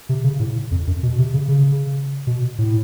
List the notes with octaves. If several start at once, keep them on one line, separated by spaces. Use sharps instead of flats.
C3
C#3
A2
F2
F#2
B2
C3
C#3
C#3
B2
A2